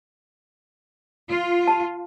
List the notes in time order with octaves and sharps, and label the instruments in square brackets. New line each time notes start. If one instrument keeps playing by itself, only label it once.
[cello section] F4
[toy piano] A5